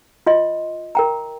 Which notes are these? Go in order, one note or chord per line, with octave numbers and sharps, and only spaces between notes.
F4 D#5 C6
A#4 G5 A#5